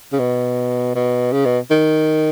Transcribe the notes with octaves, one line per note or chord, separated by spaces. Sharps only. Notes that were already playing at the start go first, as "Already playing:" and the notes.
C#3
B2
B2
C#3
B2
D#3